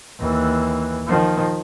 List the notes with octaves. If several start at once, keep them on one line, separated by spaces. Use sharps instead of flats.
D#2 E3
D#3 F3